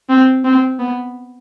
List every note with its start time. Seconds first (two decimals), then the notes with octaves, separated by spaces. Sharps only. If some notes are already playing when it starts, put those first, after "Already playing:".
0.09 C4
0.44 C4
0.79 B3